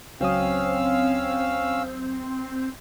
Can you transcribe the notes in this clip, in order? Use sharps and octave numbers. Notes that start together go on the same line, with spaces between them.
C#2 F#3 C4 C#4 F5 D#6 E6